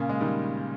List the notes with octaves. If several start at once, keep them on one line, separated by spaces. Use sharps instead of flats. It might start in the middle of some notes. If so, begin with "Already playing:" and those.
Already playing: A#2 C#3
G#3
D#3 G3